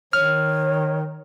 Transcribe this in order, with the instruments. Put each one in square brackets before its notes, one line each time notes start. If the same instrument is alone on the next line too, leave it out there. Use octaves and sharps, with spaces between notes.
[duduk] D#3 [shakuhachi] C#5 [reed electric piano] F6